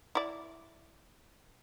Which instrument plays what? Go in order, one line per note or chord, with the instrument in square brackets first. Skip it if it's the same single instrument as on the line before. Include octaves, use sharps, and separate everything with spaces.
[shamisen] E4 D5